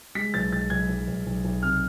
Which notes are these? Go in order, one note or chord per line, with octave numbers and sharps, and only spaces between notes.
G#3 B6
B1 A6
B1 A6
B1 G#6
B1
B1
B1
B1
C3 F6